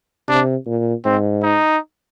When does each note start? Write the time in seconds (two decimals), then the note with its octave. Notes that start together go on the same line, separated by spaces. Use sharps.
0.28 C3 D4
0.66 A#2
1.05 G#2 C4
1.43 D#4